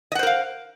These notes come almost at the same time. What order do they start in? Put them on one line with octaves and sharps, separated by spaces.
D#5 F#5 C5 A#4 F5